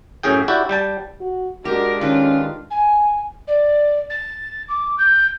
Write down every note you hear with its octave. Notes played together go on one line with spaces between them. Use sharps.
F#2 A2 G#4 G5
E4 F#4 G4 D5
G3 G5 A5
F#4
G#3 D4 F#4 G4 A#4
D#3 C#4 F4 B4
G#5
D5
A6
D6
G6